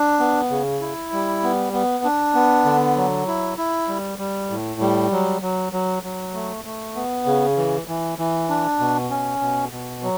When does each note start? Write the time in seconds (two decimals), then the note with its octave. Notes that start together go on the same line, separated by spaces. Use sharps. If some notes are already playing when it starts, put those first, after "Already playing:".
Already playing: D4
0.19 B3
0.50 C#3
0.81 E4
1.12 G3
1.43 B3
1.73 B3
2.04 D4
2.35 B3
2.65 D3
2.96 F#3
3.27 E4
3.57 E4
3.88 G3
4.18 G3
4.50 A2
4.80 G3
5.11 F#3
5.42 F#3
5.73 F#3
6.03 F#3
6.34 A3
6.65 A3
6.95 B3
7.26 C#3
7.57 E3
7.88 E3
8.18 E3
8.49 D4
8.80 B2
9.10 C#4
9.41 B2
9.72 B2
10.03 F#3